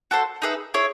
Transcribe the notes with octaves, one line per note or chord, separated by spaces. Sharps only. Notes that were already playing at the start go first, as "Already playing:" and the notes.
F#4 A4 C5
D#4 G#4 B4 E5
E4 G#4 C#5